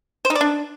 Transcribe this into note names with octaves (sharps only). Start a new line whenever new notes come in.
C5
D#4
D5
D4